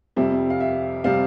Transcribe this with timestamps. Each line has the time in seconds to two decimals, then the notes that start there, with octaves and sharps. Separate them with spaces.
0.16 F2 C3 G3 C4 E5
0.50 F5
0.60 E5
1.04 C3 G3 C4 F5